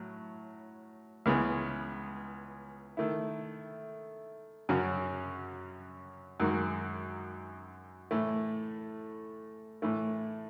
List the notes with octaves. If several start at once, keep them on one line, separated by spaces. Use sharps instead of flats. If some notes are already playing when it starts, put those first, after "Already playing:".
Already playing: A2 F#3
C#2 C#3 E3 G#3 B3
D#3 A3 E4
F#2 C#3 F#3 C#4 F#4
F#2 D#3 G#3 D#4 F#4
A2 E3 A3
A2 E3 A3